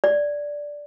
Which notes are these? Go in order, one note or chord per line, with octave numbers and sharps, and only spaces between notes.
D5